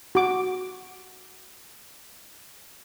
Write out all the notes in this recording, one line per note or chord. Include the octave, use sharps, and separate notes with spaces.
F#4 D6